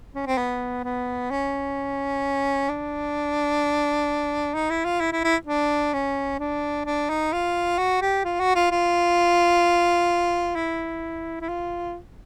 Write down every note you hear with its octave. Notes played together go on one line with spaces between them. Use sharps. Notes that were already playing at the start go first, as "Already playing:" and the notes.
C#4
C4
B3
B3
C#4
D4
D#4
E4
F4
E4
E4
E4
D4
C#4
D4
D4
D#4
F4
F#4
G4
F4
F#4
F4
F4
E4
E4
F4